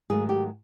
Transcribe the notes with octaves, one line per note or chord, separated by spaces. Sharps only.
G#2 D#3 F#3 A3 G#4
G4